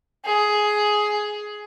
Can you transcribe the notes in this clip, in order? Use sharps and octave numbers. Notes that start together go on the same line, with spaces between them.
G#4